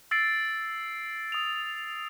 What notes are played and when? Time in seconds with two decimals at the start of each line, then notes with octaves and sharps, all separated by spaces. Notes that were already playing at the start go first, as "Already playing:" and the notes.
0.11 E6 A6 C7 D7
1.32 D#6 F7